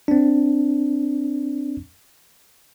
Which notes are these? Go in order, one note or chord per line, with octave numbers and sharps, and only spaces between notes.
C4 D4